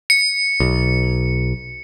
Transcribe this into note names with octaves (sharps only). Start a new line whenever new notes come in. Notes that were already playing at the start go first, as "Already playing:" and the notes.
C#7
B1